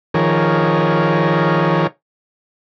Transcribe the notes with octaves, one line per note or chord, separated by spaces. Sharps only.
D#3 F3 G#4 A#4 C#5